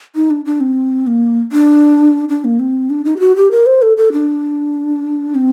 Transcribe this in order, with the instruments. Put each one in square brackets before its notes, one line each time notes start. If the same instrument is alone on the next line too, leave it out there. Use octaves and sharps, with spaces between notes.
[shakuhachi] D#4
D4
D4
C4
A#3
D4
D4
A#3
C4
D4
D#4
G4
F#4
G4
A#4
C5
A4
A4
D4
C4